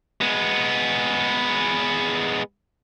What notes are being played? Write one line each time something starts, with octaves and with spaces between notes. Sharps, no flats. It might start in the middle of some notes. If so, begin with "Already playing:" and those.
G#3 B3